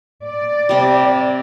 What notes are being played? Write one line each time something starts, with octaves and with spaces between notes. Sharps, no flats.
D5
C3 G3